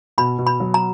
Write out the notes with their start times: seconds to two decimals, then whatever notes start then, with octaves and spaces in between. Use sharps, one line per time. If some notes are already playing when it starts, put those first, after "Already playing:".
0.18 B2 B5
0.38 B2
0.47 B5
0.60 F#3
0.74 A#5